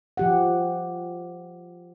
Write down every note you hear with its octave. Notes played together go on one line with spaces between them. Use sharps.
F3 G4 F#5